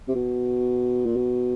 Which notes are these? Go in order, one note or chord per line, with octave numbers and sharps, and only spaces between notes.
C3
B2
A#2
B2